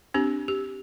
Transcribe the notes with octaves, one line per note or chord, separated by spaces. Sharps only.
C4 D4 G4
G4